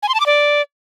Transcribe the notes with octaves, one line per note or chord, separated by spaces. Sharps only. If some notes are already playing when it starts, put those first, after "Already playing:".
G#5
C6
A5
D6
D5